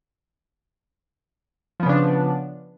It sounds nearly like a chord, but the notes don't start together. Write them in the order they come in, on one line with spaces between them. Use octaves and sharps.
F3 B3 C#3 D4